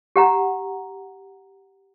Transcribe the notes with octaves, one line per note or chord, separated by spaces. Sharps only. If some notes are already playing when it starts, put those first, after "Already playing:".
G4 F#5 A#5